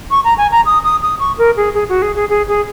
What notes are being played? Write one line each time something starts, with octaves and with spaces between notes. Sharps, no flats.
C#6
A#5
G#5
A#5
D#6
D#6
D#6
C#6
A#4
G#4
G#4
F#4
G#4
G#4
G#4
G#4